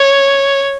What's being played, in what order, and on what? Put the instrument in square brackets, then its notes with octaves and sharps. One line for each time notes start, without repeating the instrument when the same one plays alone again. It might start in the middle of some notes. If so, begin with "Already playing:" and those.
Already playing: [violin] C#5